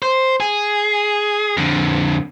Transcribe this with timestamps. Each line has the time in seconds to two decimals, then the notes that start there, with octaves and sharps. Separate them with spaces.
0.02 C5
0.40 G#4
1.57 F2 D3